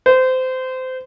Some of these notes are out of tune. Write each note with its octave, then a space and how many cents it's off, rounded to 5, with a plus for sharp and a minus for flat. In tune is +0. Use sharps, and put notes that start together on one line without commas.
C5 -25